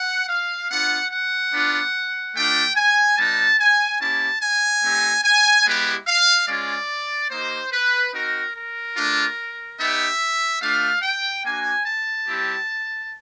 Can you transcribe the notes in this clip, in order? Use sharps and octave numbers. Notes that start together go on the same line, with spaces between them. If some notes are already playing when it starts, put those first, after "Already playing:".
Already playing: F#5
F5
B3 D4 F4 F#5
F#5
B3 D4 F4
A3 D4 F4 G5
G#5
G3 B3 D#4 A5
G#5
A#3 C#4 E4 G4 A5
G#5
A3 C4 D#4 G4
G#5
G#3 B3 E4 G4
F5
G#3 C#4 F4 D5
A#3 D#4 G4 C5
B4
C4 D#4 F#4 A#4
A#4
A3 D4 F4
B3 D#4 G4 E5
A3 D4 F4 F5
G5
A#3 D4 F#4 G#5
A5
G3 C4 E4 G4